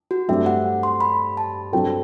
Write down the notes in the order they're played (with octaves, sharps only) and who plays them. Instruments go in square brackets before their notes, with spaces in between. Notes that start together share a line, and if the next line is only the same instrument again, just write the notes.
[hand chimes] F#4
[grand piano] G2 F#3 A3 C4 G4 [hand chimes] E5
[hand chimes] F#5
C6
B5
A5
[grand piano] G2 F#3 C4 F#4 A4 [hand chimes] G5